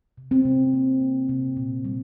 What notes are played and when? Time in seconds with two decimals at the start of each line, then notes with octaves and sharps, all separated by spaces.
0.18 C3
0.31 C4
0.45 C3
0.73 A#3
1.01 C3
1.29 C3
1.57 A#2
1.85 G3